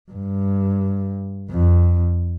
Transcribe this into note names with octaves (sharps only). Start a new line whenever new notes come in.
G2
F2